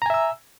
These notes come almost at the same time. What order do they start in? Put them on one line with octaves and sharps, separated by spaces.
A#5 G#5 E5 E6